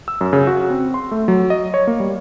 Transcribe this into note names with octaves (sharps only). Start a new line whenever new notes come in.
E6
F#2
C#3
F#4
C4
C6
A3
F#3
D#5
C#5
A#3
G3